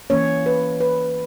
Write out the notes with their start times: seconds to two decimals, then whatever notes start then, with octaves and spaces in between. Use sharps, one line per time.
0.10 E3 A#3 C#4 C#5
0.46 B4
0.80 B4